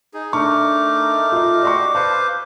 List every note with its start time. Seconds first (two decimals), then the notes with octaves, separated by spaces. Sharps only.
0.14 D#4 G#4
0.33 A3 D4 D#4 A#4 C#6 D6
1.32 F4 D#5
1.63 F#4 G4 D5 D#5 C6 C#6
1.95 B4 C5 F5 A5 C#6